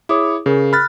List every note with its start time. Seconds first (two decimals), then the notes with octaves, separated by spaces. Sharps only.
0.09 E4 G#4 C#5 D6 D#6
0.46 C#3 G#4 A#4
0.73 B5 F6 F#6 A6